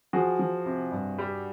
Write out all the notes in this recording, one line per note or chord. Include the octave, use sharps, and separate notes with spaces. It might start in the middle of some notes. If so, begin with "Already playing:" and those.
F3 F#4 G#4
F3
C3
G2
G3